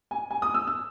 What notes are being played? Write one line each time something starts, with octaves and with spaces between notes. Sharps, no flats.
G#5
G#5
D#6
E6
E6